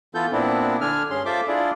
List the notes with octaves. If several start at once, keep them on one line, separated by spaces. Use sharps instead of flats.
E3 B3 F4 A4 G6
A#2 B3 C4 D4 E4
D3 D4 G#5 F6
G2 C#4 G#4 C6
F4 A4 C5 E5 D6
D4 E4 F4 G#4 D5